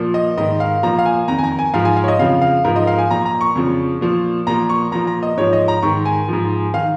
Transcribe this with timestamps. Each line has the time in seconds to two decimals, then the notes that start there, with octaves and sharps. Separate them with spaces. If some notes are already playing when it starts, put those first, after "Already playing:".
Already playing: A#2 F3
0.14 D#5
0.37 G#2 D#3 D#5
0.60 F5
0.83 A#2 F3 A#5
0.99 F5
1.06 G#5
1.28 F2 D#3 A#5
1.39 G#5
1.43 A#5
1.59 G#5
1.74 G#2 F3 F5
1.85 G#5
1.97 F5
2.04 C#5
2.08 D#5
2.19 F2 C#3 F3 F5
2.42 F5
2.64 G#2 F3 A#4
2.76 D#5
2.87 F5
2.99 G#5
3.10 A#2 F3 A#5
3.25 A#5
3.41 C#6
3.55 F2 C#3 F3
4.01 A#2 F3
4.47 A#2 F3 A#5
4.69 C#6
4.92 A#2 F3 A#5
5.07 A#5
5.23 D#5
5.37 G#2 F3 C#5
5.53 D#5
5.68 A#5
5.83 G#2 D#3 C#6
6.05 G#5
6.28 G#2 F3
6.74 D#3 F5